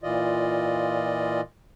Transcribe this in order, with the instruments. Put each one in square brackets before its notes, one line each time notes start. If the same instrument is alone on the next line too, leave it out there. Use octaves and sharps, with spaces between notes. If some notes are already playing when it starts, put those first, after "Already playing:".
[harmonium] A#2 E3 F4 D5 D#5